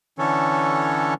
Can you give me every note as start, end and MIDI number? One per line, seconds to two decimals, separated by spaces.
0.19 1.14 50
0.19 1.14 52
0.19 1.14 61
0.19 1.14 69
0.19 1.14 73